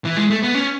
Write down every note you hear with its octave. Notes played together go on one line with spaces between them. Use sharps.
E3
G#3
A3
B3
C#4